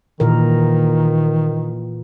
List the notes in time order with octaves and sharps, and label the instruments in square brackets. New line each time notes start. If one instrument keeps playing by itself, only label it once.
[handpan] A#2 E3 A#4 [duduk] D#3